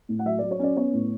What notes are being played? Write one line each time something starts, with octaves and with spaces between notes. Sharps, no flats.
A2
F#5
F#3 E5
D5
F#3
C#5
C#4 D5
B3 C#5
A2